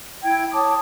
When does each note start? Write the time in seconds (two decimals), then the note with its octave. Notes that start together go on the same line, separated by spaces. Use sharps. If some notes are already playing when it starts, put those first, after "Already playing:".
0.23 E4 G5 G#6
0.52 C#5 A5 D6 D#6